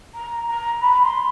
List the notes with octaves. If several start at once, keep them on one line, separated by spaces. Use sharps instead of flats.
A#5
A#5
B5
C6